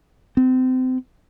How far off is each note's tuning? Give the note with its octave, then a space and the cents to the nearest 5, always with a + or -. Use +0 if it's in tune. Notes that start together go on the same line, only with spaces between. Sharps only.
C4 -30